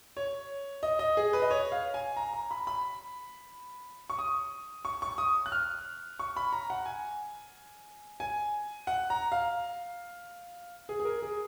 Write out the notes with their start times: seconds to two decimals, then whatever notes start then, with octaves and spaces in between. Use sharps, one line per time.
0.17 C#5
0.83 D#5
0.99 D#5
1.17 G#4
1.33 B4
1.42 D#5
1.51 C#5
1.72 F5
1.94 G#5
2.17 A#5
2.33 A#5
2.51 B5
2.67 B5
4.10 C#6
4.19 D#6
4.85 C#6
5.02 C#6
5.18 D#6
5.46 F#6
5.52 F6
6.19 C#6
6.36 B5
6.52 A#5
6.70 F#5
6.86 G#5
8.20 G#5
8.87 F#5
9.10 A#5
9.32 F5
10.89 G#4
11.00 G#4
11.05 A#4
11.22 G#4